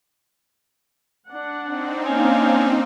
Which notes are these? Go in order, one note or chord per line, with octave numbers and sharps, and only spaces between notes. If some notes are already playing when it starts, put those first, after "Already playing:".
D4 F#5
C4 D#4
A#3 C#4 D4 F5